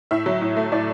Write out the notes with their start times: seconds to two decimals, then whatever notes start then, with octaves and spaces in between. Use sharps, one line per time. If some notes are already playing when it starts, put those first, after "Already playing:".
0.11 A2 E5
0.26 F#3
0.41 A2
0.57 A3
0.72 A2 D5